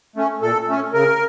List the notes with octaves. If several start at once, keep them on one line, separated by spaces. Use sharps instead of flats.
A3 C#4
A#2 A4
A3 C#4
C#3 A#4